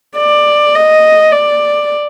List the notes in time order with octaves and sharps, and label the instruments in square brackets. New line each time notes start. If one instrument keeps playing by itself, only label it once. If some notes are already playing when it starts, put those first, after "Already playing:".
[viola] D5
D#5
D5